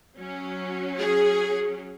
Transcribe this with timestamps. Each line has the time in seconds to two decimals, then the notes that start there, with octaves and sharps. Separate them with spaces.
0.18 F#3 C#4
0.99 G#4